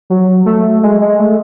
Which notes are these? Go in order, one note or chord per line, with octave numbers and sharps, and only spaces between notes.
F#3
A3
G#3
G#3
A3